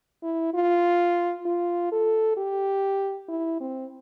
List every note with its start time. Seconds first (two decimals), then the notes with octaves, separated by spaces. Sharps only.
0.23 E4
0.54 F4
1.46 F4
1.92 A4
2.37 G4
3.29 E4
3.60 C4